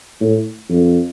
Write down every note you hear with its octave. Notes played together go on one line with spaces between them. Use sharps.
A2
F2